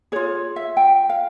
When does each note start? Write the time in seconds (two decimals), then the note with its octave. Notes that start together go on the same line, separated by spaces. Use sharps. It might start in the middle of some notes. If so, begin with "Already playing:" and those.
0.12 F4 G#4 C#5
0.56 E5
0.77 G5
1.09 F5